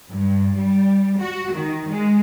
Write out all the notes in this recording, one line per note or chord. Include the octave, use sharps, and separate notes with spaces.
G2
G3
F#4
D#3
G#3